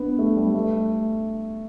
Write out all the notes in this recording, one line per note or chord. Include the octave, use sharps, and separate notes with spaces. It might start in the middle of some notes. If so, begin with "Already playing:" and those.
Already playing: B3 D4
A3
G3
A3